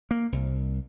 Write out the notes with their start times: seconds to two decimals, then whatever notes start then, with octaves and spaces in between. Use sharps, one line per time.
0.11 A#3
0.32 C2